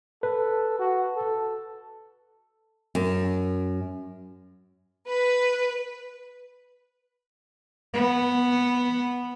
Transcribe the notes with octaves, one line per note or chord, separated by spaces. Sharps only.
A4 B4
F#4
A4
F#2
B4
B3